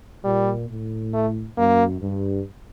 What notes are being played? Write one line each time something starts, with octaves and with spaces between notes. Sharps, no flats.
A#2 G3
A2
A3
F#2 A#3
G2